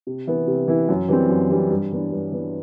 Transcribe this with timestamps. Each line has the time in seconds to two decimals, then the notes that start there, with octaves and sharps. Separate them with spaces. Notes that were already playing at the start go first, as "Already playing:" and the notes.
0.07 C3
0.27 E3 B3 E4
0.47 C3
0.68 E3 B3 E4
0.89 F#2
1.08 E3 G3 C4
1.29 F#2
1.50 E3 G3 C4
1.70 G2
1.91 E3 B3 D4
2.11 G2
2.32 E3 B3 D4